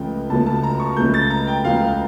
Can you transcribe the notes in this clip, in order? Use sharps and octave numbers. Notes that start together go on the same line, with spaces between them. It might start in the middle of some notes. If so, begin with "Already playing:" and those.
Already playing: C#2 C#3 F3 A3 G5
C#2 C#3 F3 A3 A5
A5
A#5
A#5
C#6
C#2 C#3 F3 A3 G6
A6
A#5
G5
C#2 C#3 F3 A3 F5